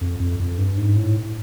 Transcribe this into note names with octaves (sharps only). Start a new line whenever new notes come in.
F2
F2
F2
G2
G#2
A2